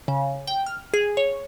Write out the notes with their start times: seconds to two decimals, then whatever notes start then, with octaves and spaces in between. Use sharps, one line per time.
0.08 C#3
0.47 G5
0.66 F6
0.94 G#4
1.17 C#5